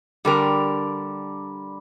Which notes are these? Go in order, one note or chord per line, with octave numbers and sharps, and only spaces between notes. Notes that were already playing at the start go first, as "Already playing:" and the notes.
D3 G3 D4 G4 A#4